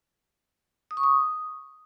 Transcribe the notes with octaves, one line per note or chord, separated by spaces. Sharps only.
D#6
C#6
D#6